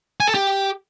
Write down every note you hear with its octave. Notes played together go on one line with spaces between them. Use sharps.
G#5
A4
G4